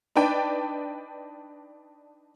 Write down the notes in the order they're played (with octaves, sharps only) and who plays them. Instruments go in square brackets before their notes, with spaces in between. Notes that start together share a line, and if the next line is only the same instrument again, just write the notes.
[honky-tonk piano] D4 D#4 B4 D5 G5 A5